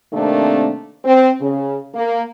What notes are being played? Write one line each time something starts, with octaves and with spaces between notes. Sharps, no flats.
C3 D#3 A3 A#3 C4 D4
C4
C#3
A#3